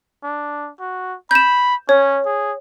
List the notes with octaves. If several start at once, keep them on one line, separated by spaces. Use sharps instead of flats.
D4
F#4
B5 G6 E7
C#4 C#5
G#4